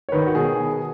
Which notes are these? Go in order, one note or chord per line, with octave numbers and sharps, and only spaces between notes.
C#5
D#3 B4
F#4
B2 G#4